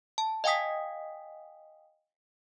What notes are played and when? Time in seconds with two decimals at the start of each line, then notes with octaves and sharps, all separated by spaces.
0.18 A5
0.44 D#5 F5 G5 G#5 D#6 B6